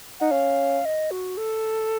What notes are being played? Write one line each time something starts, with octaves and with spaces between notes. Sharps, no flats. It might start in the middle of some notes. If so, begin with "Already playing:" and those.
D#4 F#5
C#4 F5
D#5
F#4
A4